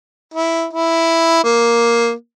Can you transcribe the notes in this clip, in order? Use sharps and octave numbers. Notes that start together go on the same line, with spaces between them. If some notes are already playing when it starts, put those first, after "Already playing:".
E4
E4
A#3